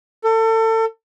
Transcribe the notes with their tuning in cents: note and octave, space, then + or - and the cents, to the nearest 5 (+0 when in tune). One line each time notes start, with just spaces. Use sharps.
A4 +30